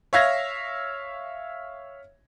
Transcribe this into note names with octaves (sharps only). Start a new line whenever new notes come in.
C#5 E5 F5 G#6 A#6